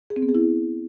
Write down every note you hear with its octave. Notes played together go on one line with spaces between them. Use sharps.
G#4
C4
B3
G#4
E4